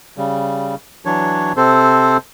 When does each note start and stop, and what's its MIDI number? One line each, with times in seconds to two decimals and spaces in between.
0.18 0.75 49
0.18 0.75 55
1.05 1.53 52
1.05 1.53 54
1.05 1.53 62
1.05 1.53 73
1.57 2.17 48
1.57 2.17 60
1.57 2.17 69
1.57 2.17 72